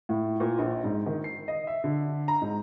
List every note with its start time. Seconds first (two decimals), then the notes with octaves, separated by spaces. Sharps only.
0.09 A2
0.40 A#2
0.59 A#1
0.84 G#2
1.06 D#3
1.24 C7
1.48 D#5
1.67 E5
1.84 D3
2.28 A#5
2.41 G#2